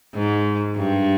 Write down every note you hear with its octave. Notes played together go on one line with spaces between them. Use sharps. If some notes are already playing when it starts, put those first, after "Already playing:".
G#2
G2